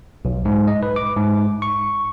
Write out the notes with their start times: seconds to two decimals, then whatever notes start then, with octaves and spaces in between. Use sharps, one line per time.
0.25 B1
0.45 G#2
0.67 D#5
0.83 B4
0.96 D6
1.16 G#2
1.62 C#6